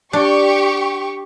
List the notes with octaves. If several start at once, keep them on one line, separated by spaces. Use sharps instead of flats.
D4 G4 C#6